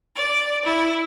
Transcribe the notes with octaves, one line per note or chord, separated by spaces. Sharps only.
D5
E4